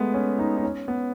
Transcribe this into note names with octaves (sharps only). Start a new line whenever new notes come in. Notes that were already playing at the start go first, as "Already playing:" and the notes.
Already playing: G#3 A3 B3
C#4
D#4
D#4
C#4
B3